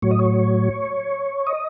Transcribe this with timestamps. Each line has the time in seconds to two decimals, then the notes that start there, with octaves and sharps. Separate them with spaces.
0.02 A2 F#3 C#5
0.11 D#5
0.19 C#5
1.47 D#5